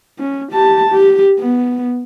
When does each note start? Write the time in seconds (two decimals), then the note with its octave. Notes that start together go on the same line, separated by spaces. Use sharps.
0.19 C#4
0.53 G4 A5
0.90 G4
1.40 B3